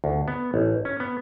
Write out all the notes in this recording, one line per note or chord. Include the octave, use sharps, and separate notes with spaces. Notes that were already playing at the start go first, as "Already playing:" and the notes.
D2
B3
A1
C#4
B3